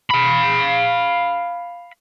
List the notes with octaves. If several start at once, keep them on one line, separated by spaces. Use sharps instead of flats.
F5 B5